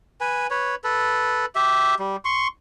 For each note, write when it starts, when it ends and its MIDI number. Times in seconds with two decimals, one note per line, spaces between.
0.21 0.47 71
0.21 0.47 80
0.51 0.75 71
0.51 0.75 73
0.84 1.46 69
0.84 1.46 71
1.55 1.95 67
1.55 1.95 76
1.99 2.16 55
2.25 2.48 84
2.25 2.48 85